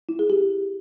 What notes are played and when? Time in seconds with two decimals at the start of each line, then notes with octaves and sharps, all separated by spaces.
0.09 E4
0.19 G#4
0.30 G4